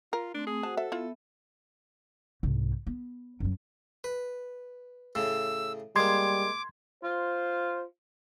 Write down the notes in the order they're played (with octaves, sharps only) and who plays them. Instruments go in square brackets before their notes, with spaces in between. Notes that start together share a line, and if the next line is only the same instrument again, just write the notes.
[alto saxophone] F4 [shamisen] A#4
[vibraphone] A3 C4 [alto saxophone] D4
[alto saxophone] G#4
[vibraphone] F#4 C5 F#5 [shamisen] A5
[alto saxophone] A4 [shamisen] E5
[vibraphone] B3 E5 [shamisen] E4 F4
[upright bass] C2 G#2
B3
F#2 F#3
[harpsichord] B4
[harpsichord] A2 C#3 [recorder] E6
[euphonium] G3 [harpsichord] G#3 A#3 [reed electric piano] C6 G#6 [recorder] D6
[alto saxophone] F4 [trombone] C5